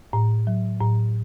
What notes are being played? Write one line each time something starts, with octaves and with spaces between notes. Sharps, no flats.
A2
F#3
A2